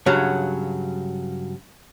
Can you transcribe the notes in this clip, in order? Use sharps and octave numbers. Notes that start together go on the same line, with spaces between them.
G2 C#3 F#3 F#4